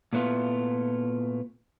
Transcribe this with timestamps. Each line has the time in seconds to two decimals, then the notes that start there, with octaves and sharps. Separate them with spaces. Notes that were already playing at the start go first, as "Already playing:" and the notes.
0.13 A#2 A3 B3 E4 F4